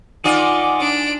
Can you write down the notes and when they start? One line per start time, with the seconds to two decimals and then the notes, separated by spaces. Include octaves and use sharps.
0.24 D#3 D#4 F4 D5 F#5 G#5 D6
0.80 D4 D7